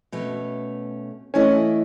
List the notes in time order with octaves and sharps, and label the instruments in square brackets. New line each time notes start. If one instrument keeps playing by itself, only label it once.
[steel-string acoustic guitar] B2 A3 C#4
[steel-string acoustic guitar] E3 A3 E4 A4 D#5 [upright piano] C#4